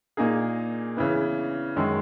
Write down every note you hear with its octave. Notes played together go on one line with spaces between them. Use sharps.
A#2 A#3 D#4 G#4
C#3 E3 B3
F#2 D#3 G#3